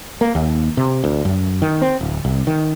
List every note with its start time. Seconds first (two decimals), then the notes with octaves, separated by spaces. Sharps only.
0.21 A#3
0.35 D#2
0.77 C3
1.04 D2
1.25 F#2
1.62 D#3
1.82 C4
2.01 D1
2.25 C2
2.47 D#3